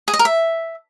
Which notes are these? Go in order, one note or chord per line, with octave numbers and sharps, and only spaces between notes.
G#4
D#5
A#4
E5